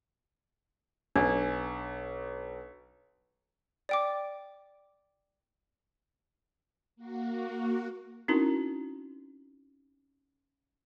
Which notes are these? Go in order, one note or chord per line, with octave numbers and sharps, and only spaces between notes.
B1 D4
D5 G5 D6
A#3 F#4
C4 C#4 D#4 E4 F#4 A#4